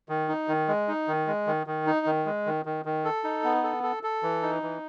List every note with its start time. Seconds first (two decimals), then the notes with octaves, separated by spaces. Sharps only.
0.09 D#3
0.28 D#4
0.48 D#3
0.68 G#3
0.88 D#4
1.08 D#3
1.27 G#3
1.47 D#3
1.67 D#3
1.87 D#4
2.06 D#3
2.26 G#3
2.46 D#3
2.65 D#3
2.85 D#3
3.05 A4
3.24 D#4
3.44 B3
3.64 A4
3.83 A4
4.03 A4
4.23 E3
4.43 D#4
4.62 E3